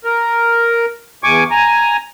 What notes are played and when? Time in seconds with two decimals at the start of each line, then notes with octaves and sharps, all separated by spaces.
0.04 A#4
1.24 E2 G#5 C#6 D6
1.51 G#5 A#5